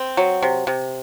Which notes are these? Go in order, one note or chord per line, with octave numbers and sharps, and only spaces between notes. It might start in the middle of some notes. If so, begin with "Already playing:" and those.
Already playing: C4
F#3
C3
C3